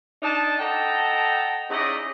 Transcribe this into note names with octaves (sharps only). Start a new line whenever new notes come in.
D4 D#4 A5
A4 D#5 F#5 G5 A5 A#5
C#4 D#4 E4 G#4 D5 D#5